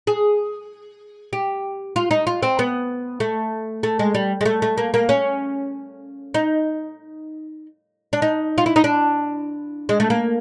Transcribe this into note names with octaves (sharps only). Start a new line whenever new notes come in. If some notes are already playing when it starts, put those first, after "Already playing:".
G#4
G4
F4
D#4
F4
C4
B3
A3
A3
G#3
G3
G#3
A3
A3
A#3
A#3
C#4
D#4
D4
D#4
F4
E4
D#4
D4
G#3
A3
A#3